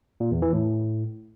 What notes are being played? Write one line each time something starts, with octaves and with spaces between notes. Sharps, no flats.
A#2
E2
E3
A2